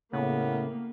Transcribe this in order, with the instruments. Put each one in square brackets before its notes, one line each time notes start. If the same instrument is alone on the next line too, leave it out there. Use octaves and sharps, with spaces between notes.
[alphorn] A2 [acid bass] C#3 [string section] A#3 [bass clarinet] B3